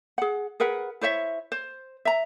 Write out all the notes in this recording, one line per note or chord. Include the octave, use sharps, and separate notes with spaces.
G#4 F#5
G#4 A#4 B4 F#5
E4 C5 C#5 E5
C5
E5 A#5